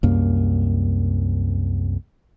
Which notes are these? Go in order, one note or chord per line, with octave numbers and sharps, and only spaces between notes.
C2 F#2 A#3